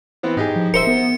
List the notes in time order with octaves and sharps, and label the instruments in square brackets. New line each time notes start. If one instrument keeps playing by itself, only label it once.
[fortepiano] E3 B3 C4
[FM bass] G#2 [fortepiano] D#4 G4 G#4
[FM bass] F3
[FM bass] D#1 [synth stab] A#4 C5 E5 [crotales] C#7
[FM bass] B3